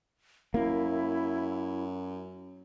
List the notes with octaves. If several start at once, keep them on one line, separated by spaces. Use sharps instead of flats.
F#2 A#3 E4